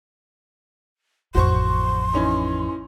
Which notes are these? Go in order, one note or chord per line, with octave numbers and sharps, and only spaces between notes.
A1 F2 F#4 C5 C6 C#6
E3 C#4 D#4